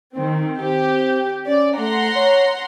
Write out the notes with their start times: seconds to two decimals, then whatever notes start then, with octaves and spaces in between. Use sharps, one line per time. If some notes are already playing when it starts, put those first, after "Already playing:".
0.16 D#3 C4
0.60 C4 G4
1.47 C#4 D5
1.78 A3 F#5 A#5 C6
2.16 C#5